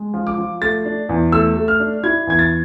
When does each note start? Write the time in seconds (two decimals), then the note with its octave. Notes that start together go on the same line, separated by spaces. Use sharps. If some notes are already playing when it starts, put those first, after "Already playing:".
Already playing: G#3
0.14 F3
0.27 D6
0.38 F3
0.62 A3 A6
0.85 D4
1.09 E2
1.32 A3 E6
1.56 A3
1.68 F6
1.80 D4
2.04 E4 G#6
2.27 E2 G#6
2.39 A6